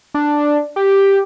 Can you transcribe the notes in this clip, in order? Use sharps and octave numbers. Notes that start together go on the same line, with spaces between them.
D4
G4